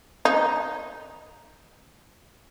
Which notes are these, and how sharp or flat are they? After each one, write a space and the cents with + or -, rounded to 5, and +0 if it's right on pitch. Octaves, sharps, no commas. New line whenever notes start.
D#4 -5